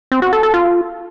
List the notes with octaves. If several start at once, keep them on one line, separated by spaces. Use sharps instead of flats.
C4
F#4
A4
A4
F4